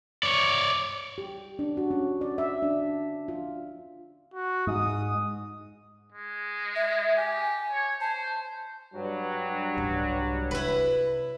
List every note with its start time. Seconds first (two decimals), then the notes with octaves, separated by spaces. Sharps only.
0.23 C#5 D5
1.18 G4
1.59 D4
1.77 F#4
1.91 C#4
2.21 D5
2.38 E5
2.63 D4
3.28 F4
4.34 F#4
4.67 G#2 D#6
6.12 G#3
6.76 E5
7.17 G4 G#5
7.70 C#5
8.01 C5 A5
8.95 G2 F#3 G3
9.77 C2 G#2
10.51 C3 E4 B4